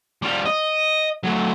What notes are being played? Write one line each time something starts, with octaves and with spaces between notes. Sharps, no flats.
G3 F4
D#5
F#3 A3